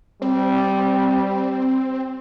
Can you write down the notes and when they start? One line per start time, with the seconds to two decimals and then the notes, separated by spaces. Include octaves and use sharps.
0.22 G3 C4